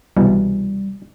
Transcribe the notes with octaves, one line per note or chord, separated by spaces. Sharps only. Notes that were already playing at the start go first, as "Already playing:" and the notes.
C2 B2 E3 G3